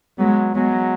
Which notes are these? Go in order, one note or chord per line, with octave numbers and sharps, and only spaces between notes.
F#3 G#3 B3
F#3 G#3 B3